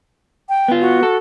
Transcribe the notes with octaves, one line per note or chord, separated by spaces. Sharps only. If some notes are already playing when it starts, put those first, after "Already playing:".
G5
B3 F4
F#4
A4